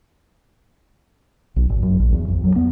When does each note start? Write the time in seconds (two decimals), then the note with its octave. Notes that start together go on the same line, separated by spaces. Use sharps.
1.56 B1
1.69 G#1
1.82 F#2
2.00 A#1
2.12 E2
2.28 F2
2.44 F#3
2.56 B3